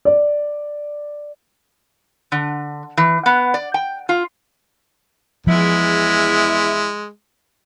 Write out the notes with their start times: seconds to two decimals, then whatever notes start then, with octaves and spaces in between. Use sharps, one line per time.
0.05 D5
2.32 D3
2.97 E3
3.26 B3
3.54 D5
3.74 G5
4.09 F4
5.47 E2 F3 G#3 E4